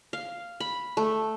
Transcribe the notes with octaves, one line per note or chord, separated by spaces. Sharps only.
F5
B5
A3